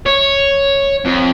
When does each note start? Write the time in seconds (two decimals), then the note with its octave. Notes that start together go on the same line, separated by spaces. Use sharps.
0.06 C#5
1.05 F2